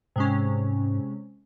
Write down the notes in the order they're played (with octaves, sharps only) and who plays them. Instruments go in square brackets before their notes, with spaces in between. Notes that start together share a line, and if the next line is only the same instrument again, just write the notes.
[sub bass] G#2 [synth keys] C3 G#3 C#4